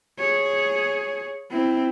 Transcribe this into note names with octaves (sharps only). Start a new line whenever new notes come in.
G#4 C#5
C4 E4